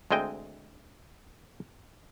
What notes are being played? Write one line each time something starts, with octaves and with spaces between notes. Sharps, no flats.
D2 G#3 C4 D#5 G5